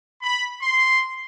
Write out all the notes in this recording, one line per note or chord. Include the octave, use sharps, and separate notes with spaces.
B5
C6